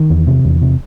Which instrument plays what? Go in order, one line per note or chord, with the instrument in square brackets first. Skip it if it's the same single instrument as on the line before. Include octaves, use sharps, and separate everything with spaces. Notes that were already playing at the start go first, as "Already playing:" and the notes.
Already playing: [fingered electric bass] D#3
E2
C3
E2
C3